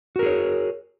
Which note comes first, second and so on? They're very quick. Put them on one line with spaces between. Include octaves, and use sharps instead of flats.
F#4 A#4 G#4 C#5